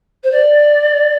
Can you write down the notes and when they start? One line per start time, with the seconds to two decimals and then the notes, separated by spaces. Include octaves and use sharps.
0.23 C5
0.31 D5